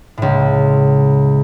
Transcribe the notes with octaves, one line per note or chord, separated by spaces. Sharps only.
C#2 A2